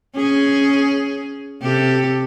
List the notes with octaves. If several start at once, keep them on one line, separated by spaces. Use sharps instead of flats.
C#4 G#4
C3 G4 A4